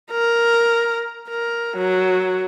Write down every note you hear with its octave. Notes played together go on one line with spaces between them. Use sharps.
A#4
A#4
F#3